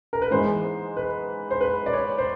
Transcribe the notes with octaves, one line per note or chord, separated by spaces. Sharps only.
A#4
B4
G#2 E3 G#3 B3 C5
B4
C5
B4
D5
C#5
C5